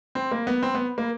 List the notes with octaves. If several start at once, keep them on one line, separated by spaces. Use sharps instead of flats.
C4
A#3
B3
C4
B3
A#3